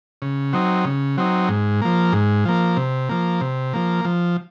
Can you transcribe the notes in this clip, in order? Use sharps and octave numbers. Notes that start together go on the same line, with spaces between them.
C#3
F#3 C4 D#4
C#3
F#3 C4 D#4
G#2
F3 A#3
G#2
F3 A#3
C3
F3 A#3
C3
F3 A#3
F3